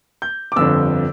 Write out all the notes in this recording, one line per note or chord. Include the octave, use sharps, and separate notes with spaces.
G6
D6
G1 F2 D3 E6